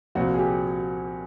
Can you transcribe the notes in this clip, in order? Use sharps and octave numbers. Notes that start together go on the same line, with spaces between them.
C2 A#2 F3 F#4
G#4
G4